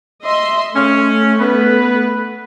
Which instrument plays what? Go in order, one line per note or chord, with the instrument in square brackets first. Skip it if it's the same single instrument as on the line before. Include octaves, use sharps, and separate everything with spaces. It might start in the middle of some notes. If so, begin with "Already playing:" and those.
[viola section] D#5 E5 C6
[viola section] A3 [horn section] C#4
[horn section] B3 B4